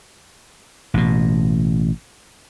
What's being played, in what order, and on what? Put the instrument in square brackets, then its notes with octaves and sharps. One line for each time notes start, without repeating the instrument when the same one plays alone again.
[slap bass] A1 B2